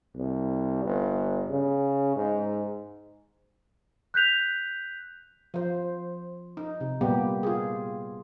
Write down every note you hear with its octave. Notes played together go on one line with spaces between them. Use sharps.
C2
G1
C#3
G#2
F#6 G6 B6 F7
F3 C5
D#4
C3
A#2 G3 A#3 B3 G4
F4 G#4